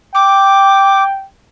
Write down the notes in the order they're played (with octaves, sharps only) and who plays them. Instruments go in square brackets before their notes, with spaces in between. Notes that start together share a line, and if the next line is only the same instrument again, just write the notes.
[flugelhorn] G5 [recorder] D6